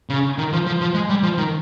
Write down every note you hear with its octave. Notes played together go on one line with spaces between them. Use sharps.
C#3
D#3
F3
F3
F3
G#3
G3
F3
D#3